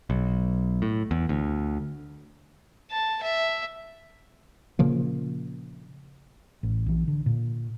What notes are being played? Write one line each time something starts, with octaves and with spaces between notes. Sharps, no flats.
B1
A2
E2
D2
A5
E5
A#2 C#3 F3 A#3
A1
A#1 E3
D3
A#2